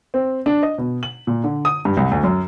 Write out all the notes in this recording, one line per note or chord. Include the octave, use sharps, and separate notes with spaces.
C4
D4
D#5
B2
F#7
A#2
D3
D#6
G2
C2
D2
F#2